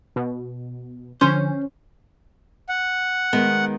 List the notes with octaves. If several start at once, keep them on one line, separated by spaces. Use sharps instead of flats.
B2
D3 F3 C#4 C5
F#5
D#3 G#3 B3